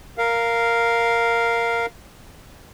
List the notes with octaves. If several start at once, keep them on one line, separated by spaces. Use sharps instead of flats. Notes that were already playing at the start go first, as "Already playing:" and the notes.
A#4 F5